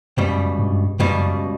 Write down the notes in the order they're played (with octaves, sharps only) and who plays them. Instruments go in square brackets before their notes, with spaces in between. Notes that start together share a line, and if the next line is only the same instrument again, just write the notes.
[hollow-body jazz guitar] C#2 B2 G3 [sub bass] F#2
[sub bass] G2
[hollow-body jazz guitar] C#2 B2 G3 [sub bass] F#2